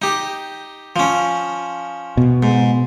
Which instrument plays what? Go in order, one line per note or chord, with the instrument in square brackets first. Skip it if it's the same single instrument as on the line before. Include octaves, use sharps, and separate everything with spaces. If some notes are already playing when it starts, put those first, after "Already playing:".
[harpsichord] D#4 G4
F3 C#4
[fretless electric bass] B2
[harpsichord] G#2